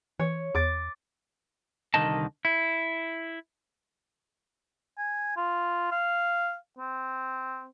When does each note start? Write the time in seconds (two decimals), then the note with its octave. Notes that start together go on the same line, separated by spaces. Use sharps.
0.19 E3 C#5
0.55 E2 D6 A6
1.94 C2 D3 D#3 D#4 D#5 A5
2.45 E4
4.98 G#5
5.37 F4
5.92 F5
6.79 C4